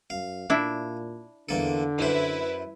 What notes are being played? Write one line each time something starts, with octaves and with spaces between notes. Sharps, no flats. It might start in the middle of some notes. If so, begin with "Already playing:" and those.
F#2 F5
A#2 D4 E4
E2 D3 A#3 A4
F#2 E4 B4 C5